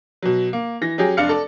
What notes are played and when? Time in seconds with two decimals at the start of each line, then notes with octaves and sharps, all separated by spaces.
0.22 B2 F#3
0.53 A#3
0.81 E3 A#6
0.98 F#3 C#4 G4 G#4
1.17 F1 D4 F5 C#7
1.29 A4 D5